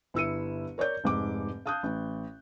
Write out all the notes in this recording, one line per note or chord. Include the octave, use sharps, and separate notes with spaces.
G1 E4 E6 C#7 D#7
A#4 C#5 D5 G6
F1 G#2 D6
F5 A5 D#6 F#6 G6
A1